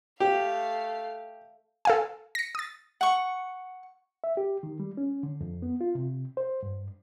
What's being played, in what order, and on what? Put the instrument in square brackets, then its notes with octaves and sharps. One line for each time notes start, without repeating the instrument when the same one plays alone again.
[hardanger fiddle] A3 F5 [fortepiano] G4
[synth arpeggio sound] A4 F5 G#5
A#6 C#7
D#6 A6
[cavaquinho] F#5 C#6
[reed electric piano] E5
G4
D#3
G3
C#4
D3
F2
B3
F4
C3
C5
G2